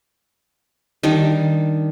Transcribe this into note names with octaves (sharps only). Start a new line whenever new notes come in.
D#3 G3 D4